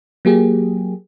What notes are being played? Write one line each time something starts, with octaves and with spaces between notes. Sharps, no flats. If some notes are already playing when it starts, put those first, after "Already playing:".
F#3 A#3 G4 G#4